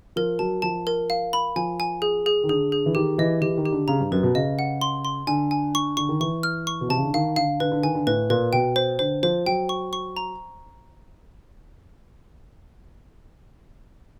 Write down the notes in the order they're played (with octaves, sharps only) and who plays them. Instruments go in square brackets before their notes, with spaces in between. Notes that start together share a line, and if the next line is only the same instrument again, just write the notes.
[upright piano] F3 [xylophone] A#4
[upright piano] F#3 [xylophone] A5
[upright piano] F3 [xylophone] A5
[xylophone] A#4
F5
B5
[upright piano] F3 [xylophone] G#5
[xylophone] G#5
G#4
G#4
[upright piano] D#3
[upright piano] D3 [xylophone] G#4
[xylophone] G#4
[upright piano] E3
[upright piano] D#3 [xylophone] G4
[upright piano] E3 [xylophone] D#5
[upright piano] E3 [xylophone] G4
[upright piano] D#3
[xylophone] G4
[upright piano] D3
[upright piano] C#3 [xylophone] A#5
[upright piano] G2
[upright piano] F#2 [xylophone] B4
[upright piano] B2
[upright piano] C#3 [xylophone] D#5
[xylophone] F#5
C6
C6
[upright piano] D3 [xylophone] G#5
[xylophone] G#5
C#6
[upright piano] D3 [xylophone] C#6
[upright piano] D#3
[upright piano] E3 [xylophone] C#6
[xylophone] F6
C#6
[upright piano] B2
[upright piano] C3 [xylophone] A5
[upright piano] C#3
D3
[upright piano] D#3 [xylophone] F5
[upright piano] D3 [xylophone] F5
[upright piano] D3 [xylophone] B4
[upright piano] D3
[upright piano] D#3 [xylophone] G#5
[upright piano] D3
[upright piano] A2 [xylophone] B4
[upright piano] A#2 [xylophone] B4
[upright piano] B2 [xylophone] G5
[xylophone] C5
[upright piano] D3 [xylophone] C5
[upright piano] F3 [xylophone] C5
[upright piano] F#3 [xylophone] G5
[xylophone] C#6
C#6
A#5